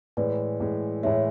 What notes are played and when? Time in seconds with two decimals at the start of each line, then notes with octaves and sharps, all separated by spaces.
0.17 A2 E3 G#3 B4 D5
0.60 A2 E3 G#3
1.03 A2 E3 G#3 C#5 E5